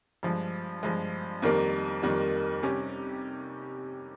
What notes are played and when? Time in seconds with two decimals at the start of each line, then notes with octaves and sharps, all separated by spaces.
0.23 G2 F3 G#3
0.83 G2 F3 G#3
1.42 F2 D#3 G3 A#3
2.03 F2 D#3 G3 A#3
2.63 C3 G3 C#4 G4